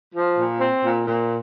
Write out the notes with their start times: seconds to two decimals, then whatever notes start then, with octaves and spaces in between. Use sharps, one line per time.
0.15 F3
0.37 A#2
0.60 C4
0.83 A#2
1.06 A#2